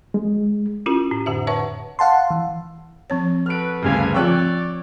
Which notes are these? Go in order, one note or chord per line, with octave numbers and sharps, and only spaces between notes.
G#3
C#4 E4 F4 G4 A#4
A2
F2 A2 D3 G4 E5
B4 C#5 E5 F#5 A5 C#6
F5 F#5 A5 C6
E3
F3 C4 C#5
F#4 A4 B4 F6 D7
D2 G2 C#3 C#4 F5 G#5
F3 C4 F4 C#5 D5 G5 E6 F#6